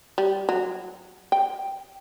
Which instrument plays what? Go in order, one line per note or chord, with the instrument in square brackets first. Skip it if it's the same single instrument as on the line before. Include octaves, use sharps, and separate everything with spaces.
[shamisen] G3
F#3
G5